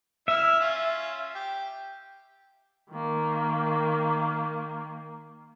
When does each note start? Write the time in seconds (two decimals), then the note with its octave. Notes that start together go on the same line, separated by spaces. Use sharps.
0.28 E4 E5 E6 F6
0.60 C#4 F4
1.35 G4
2.91 D#3 A#3